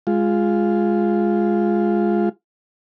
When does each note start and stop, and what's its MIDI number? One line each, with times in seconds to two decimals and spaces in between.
0.07 2.29 56
0.07 2.29 65